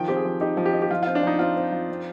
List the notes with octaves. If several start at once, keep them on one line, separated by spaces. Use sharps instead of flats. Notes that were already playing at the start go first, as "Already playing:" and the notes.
Already playing: D#3 F3 G5
C4 G4
G#4
F3
D#4 G4
F3
G4
D#4
G4
F3 F4
F4
C4
D4
F3 D#4
C4 F4
C4
F3
C4